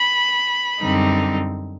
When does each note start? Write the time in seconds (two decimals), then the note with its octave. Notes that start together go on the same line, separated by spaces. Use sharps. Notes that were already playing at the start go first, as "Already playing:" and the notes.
Already playing: B5
0.81 F#2 D3 G3 C4 D#4